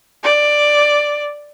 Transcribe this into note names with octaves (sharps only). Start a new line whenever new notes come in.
D5